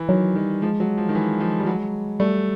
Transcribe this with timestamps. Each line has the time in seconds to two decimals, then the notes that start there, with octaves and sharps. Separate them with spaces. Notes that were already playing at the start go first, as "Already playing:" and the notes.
Already playing: E3
0.09 D#3 F#3
0.36 D#3 G3
0.62 F3 G#3
0.80 F#3
0.97 F3
1.09 D#3
1.15 E3
1.40 F3
1.60 G3
1.67 F#3
2.20 G3 A3